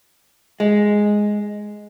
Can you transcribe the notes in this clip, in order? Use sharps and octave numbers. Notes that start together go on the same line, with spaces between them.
G#3